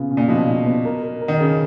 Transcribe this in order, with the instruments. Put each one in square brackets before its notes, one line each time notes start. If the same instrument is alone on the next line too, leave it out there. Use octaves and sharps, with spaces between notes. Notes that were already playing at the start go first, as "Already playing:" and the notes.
Already playing: [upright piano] C#3 B3 F4
C#3
[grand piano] A#2
[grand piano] B2 [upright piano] F3
[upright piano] F3
B3
A#4
A#4
A#4
[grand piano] D#3
[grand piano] C#3 [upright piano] A#4